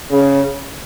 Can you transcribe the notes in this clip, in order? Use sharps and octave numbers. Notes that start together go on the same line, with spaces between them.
C#3